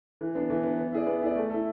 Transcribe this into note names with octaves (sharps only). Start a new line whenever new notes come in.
E3
B3 D4
E3
B3 D4
B3
E4 G#4 D5
B3
E4 G#4 D5
A3
E4 A4